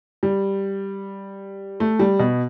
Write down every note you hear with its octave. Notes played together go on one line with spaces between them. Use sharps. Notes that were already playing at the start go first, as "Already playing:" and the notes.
G3
A3
G3
B2